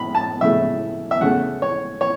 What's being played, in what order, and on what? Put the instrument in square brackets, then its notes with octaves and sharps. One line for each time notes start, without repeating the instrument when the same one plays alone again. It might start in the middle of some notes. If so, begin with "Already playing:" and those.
Already playing: [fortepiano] E4 B5
A5
C#3 A3 E4 E5
E5
E2 C#3 A3 C#4 F#5
C#5
C#5